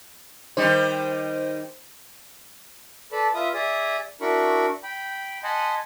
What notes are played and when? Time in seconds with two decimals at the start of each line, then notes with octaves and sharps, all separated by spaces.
0.57 D#3 G3 D#4 C5
3.12 A4 B4 D5 A5 B5
3.35 F4 B4 E5 D#6
3.54 G#4 D5 E5 D#6
4.21 D4 E4 F#4 A#4 B5 C#6
4.83 G5 B5
5.44 D#5 F#5 G#5 A5 B5 C6